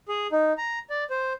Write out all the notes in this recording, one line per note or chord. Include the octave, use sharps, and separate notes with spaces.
G#4
D#4
A#5
D5
C5